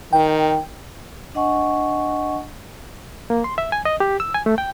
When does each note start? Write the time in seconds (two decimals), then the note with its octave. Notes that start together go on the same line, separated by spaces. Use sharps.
0.13 D#3 G5
1.35 D4 D#5 F#5 G#5 C#6
3.30 A#3
3.44 C6
3.58 E5
3.72 G#5
3.85 D#5
4.00 G4
4.20 E6
4.34 G#5
4.46 A3
4.58 G5